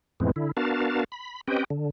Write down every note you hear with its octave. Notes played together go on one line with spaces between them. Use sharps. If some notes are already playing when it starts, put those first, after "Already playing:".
F2 A2 E3 G#3 B3 C4
D3 E4
B3 D4 F#4 A#4 F5 A5
B5
C4 C#4 G4 B4 D#5 G5
D3